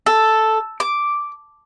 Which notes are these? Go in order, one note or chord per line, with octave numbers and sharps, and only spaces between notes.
A4
D6